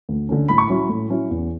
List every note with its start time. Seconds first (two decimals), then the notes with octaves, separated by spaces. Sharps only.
0.09 D2
0.29 D3 A3 C#4
0.48 A2 B5
0.58 C#6
0.67 F#3 C#4 E4 B5
0.89 A2
1.10 F#3 C#4 E4
1.30 E2